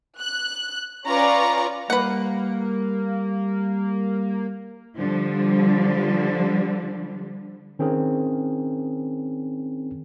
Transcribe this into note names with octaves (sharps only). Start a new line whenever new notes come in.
F#6
C#4 F4 B4 D5 A#5 C#6
G3 A#3 B4 F#5
D3 F3 G3
D#3 C4 C#4 G#4 A#4